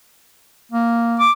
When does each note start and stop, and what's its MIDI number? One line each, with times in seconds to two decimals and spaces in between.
0.72 1.25 58
1.20 1.32 86